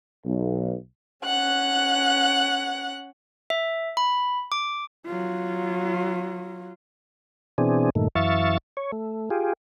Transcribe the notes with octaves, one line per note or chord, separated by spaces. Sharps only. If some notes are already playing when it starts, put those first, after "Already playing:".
B1
C#4 F#5 F#6
E5
B5
D6
F#3 F4
B2 E3 C4 D4 G#4
G2 A#2 D#3 A3
F#2 E3 E5 F5 C#6 A6
C#5
A3
F4 G4 G#4